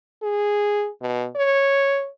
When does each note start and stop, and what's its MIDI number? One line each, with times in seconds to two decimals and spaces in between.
0.23 0.89 68
1.02 1.28 47
1.36 2.09 73